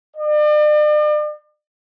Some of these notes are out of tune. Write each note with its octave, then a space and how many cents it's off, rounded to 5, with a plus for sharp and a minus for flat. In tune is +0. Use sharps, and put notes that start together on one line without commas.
D5 +40